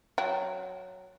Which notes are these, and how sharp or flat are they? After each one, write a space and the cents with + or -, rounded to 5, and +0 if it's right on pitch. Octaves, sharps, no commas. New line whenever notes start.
F#3 +0 G5 -25